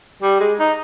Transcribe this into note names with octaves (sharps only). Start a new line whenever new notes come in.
G3
G#3
D#4